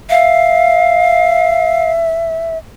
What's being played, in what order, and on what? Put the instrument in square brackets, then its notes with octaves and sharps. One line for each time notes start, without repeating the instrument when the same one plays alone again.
[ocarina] E5 [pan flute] F5